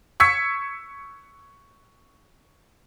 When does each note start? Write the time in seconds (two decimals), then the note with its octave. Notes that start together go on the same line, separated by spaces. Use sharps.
0.20 C#6 E6 G#6 B6 C#7